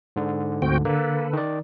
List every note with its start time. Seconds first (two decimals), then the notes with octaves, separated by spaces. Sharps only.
0.16 G#2 D3
0.62 D2 C4 F#4 G5
0.85 D3 A#3 A4 B4
1.33 D#3 D5